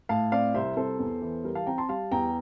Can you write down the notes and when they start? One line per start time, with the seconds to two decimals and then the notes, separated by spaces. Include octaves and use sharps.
0.09 A2 F5 A5
0.32 C4 D5 F5
0.54 C2 C5 E5
0.77 C2 A4 C5
0.99 E2
1.22 E3
1.44 G3 A#4
1.55 F5 A5
1.67 C4 G5 A#5
1.78 A5 C6
1.89 G3 F5 A5
2.12 E2 G5 A#5